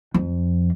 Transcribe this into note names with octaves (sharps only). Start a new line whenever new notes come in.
F2